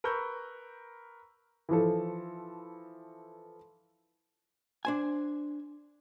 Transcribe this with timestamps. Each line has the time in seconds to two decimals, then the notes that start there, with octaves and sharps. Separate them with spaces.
0.04 A#4 B4 B5 C#6 E6 G6
1.69 E3 F3 A4
4.85 D4 C5 G#5